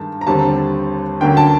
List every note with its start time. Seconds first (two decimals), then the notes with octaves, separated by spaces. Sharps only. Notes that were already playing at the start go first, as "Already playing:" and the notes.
Already playing: G2 D#3 G#3 A5
0.21 A#5
0.27 D#2 D3 G3 C4 A5
1.20 D2 D3 F#3 A#3 C#4 G5
1.37 A5